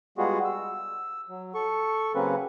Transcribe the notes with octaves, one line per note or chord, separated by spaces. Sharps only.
G3 G#3 B3 F4 F#4 G#4
E6
F#3
A4 C#6
C#3 F#3 A#3 C4 C#4 B4